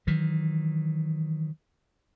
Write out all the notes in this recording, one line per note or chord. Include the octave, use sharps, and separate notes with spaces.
D#3 E3 F#3